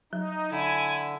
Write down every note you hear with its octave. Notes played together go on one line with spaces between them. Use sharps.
F#3 D#4
D3 E4 G#5